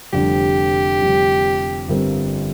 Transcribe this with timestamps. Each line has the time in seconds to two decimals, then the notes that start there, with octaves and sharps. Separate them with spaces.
0.13 F1 F2 D3 G3 G4
1.01 F1 F2 D3 G3
1.89 G1 G2 G3 C4 A#4